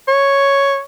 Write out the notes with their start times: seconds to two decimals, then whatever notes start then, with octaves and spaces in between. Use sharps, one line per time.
0.08 C#5